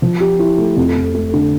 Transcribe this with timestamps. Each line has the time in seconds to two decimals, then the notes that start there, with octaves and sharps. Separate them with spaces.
0.02 F3
0.20 G4
0.39 E4
0.58 A3
0.77 F2
0.96 F2
1.15 A3
1.33 D3